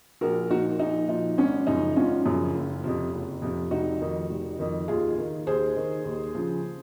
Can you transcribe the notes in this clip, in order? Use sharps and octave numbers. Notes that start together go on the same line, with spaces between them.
A#1 F#4 A#4
A#2 F3 D#4 F#4
A#1 D#4
A#2 F3 D#4
G#1 C#4
F#2 C#3 F3 D#4
G#1 C#4 F4
F#2 C#3 F3
F#1
F2 C3 F3
F#1
F2 C3 F3
F1 D#4 F#4
F2 D#3
F1
F2 D#3
D#2 F4 G#4
D#3
D#2 G#4 C5
D#3
D#2
C#3 F3